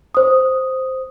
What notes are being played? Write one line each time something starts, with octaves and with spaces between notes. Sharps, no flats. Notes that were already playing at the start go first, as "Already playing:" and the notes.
C5 D#6